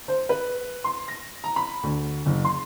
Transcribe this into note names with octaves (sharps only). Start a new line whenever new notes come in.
C5
B4
C6
A#6
A#5
B5
D2
F#1
C6